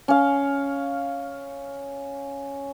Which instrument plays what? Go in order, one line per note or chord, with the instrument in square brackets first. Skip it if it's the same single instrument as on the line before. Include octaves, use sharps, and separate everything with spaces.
[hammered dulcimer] C#4 F5